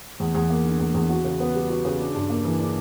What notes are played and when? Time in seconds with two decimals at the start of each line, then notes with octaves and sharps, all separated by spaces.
0.20 E2
0.35 E2
0.50 A#3
0.65 D3
0.80 E2
0.94 E2
1.09 F#4
1.24 C#3
1.40 B3
1.55 G3
1.70 F#4
1.85 C#3
1.99 D4
2.14 G2
2.30 A#3
2.45 E3
2.59 D4